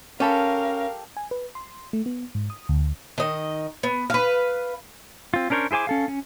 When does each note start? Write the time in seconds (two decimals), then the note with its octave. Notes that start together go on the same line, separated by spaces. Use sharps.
0.20 C#4 G4 A4 A#4 F5 B5
1.17 G#5
1.31 B4
1.55 C6
1.93 A3
2.06 B3
2.35 G#2
2.50 D#6
2.69 D2
3.18 D#3 D#5
3.83 B3
4.10 B4 F5
5.34 C4 F4
5.50 C#4 D4 A#4 C5 C#5
5.71 E4 G#4 C5 G#5 D6
5.87 C#4 A4 F5
6.08 C#4